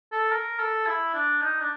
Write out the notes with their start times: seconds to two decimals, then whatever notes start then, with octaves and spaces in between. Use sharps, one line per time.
0.12 A4
0.31 A#4
0.59 A4
0.86 E4
1.14 D4
1.41 D#4
1.60 D4